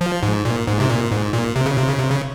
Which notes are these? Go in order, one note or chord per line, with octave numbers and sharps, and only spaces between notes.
F3
G#2
A#2
G#2
C3
A#2
G#2
A#2
C3
C#3
C3
C#3
C3
C#3